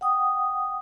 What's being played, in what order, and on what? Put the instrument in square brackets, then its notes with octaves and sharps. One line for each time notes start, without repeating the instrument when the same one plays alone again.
[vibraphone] F#5 G5 D#6